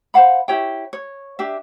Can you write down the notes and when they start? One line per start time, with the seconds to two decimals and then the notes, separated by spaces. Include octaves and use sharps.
0.14 C5 F5 F#5 B5
0.48 E4 G4 C#5 G5
0.93 C#5
1.39 D4 G4 E5